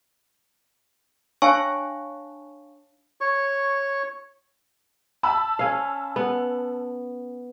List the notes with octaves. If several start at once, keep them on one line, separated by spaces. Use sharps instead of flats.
D4 C#5 F5 G#5 A5 C#6
C#5 C#6
A5 B5 E6
C#4 F5
B3